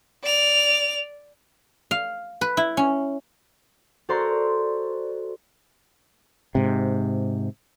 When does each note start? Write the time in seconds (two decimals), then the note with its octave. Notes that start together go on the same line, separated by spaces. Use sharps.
0.24 D5 F7
1.91 F5
2.41 B4
2.57 E4
2.77 C#4
4.09 F#4 A4 C5 D5 A#5 C6
6.55 G#2 C3